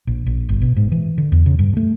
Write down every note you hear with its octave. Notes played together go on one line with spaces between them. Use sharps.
A#1
A#1
G1
B2
G#2
E3
D3
E2
C#3
G2
A3